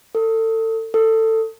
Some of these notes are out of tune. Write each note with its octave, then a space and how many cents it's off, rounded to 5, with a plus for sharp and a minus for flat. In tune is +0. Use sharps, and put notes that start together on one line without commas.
A4 +30
A4 +20